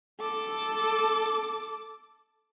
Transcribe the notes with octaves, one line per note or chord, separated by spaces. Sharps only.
A4 D6